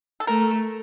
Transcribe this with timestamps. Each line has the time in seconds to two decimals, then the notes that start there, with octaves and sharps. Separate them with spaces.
0.20 A4
0.27 A3 A#4